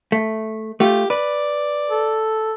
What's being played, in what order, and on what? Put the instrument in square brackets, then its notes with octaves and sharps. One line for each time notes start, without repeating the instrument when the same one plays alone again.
[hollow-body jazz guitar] A3
[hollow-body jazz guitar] A3 F4 [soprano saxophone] G4
[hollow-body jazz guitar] B4 [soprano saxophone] D5
[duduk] A4